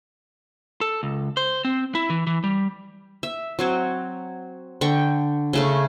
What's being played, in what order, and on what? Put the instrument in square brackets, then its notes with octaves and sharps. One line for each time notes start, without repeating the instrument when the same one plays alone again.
[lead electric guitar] A4
C#2
C5
C4
E4
E3
E3
G3
[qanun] E5
F#3 C4 C#5
D3 G5 C#6
C#3 A3 C#4